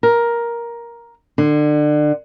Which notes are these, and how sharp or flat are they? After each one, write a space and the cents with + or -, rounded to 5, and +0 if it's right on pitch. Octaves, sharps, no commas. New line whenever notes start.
A#4 +10
D3 +30